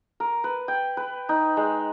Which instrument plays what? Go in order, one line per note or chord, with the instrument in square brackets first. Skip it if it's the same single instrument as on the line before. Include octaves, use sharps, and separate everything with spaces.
[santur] A#4
B4
G5
B4
D#4
G#3